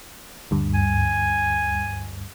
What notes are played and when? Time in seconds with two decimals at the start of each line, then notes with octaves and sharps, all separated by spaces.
0.51 D2 G2
0.74 G#5